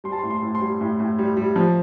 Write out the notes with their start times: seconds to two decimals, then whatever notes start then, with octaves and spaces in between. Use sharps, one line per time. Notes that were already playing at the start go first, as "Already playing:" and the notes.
0.04 G3 C6
0.12 A5
0.19 C6
0.23 A2
0.30 C6
0.42 A2
0.55 C6
0.61 G3
0.81 A2
1.00 A2
1.18 G3
1.37 G3
1.56 F3